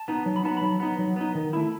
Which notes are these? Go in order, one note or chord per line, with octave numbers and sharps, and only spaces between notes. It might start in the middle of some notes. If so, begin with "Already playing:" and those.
Already playing: A5
B3 D#4
F#3
B5
B3 D#4 A5
F#3 B5
B3 D#4
F#3
B3 D#4
D#3
A3 E4